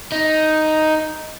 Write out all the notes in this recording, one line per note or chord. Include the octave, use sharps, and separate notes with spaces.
D#4